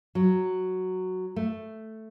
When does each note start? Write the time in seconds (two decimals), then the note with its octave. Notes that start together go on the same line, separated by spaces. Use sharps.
0.15 F#3
1.36 A3